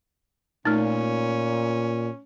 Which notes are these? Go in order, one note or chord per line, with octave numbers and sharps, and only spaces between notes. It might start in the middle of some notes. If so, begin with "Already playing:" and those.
A#2 A3 C#4 D#4